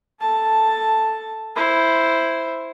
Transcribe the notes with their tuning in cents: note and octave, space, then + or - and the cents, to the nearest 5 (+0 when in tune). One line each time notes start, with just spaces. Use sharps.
A4 +0 A5 +5
E4 +0 C5 +0